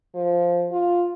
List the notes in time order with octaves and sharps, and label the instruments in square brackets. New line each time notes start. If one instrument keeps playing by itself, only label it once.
[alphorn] F3
F4